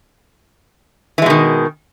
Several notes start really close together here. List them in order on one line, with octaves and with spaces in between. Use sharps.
E3 G#3 B2 D#3